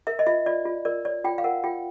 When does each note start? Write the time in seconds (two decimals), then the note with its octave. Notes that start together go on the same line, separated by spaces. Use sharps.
0.07 A#4 E5
0.19 D#5
0.26 F4 E5
0.46 F4 D5
0.65 F4
0.85 A#4 D5
1.05 C#5 D5
1.24 F4 G5
1.38 F5
1.44 A#4 F#5
1.64 F4 G5